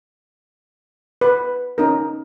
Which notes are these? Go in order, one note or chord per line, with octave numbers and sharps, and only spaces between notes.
B4
C#4 D#4 A#4